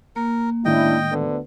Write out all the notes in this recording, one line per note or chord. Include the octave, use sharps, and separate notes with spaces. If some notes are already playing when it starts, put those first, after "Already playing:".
A#3 A#4
A2 D#3 G#3 C#4 D4 E4 D#5 G5
D2 D3 B3